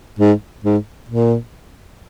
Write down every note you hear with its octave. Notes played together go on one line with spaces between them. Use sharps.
G#2
G#2
A#2